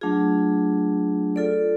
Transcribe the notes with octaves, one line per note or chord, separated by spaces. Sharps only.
F#3 A3 D4 F4 G#4
F4 A4 D5